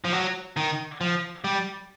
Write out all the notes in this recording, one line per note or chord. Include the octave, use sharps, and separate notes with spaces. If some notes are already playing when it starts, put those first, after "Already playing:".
F3
F#3
D#3
F3
G3